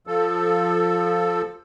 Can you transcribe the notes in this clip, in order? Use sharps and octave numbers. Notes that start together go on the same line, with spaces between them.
F3 A4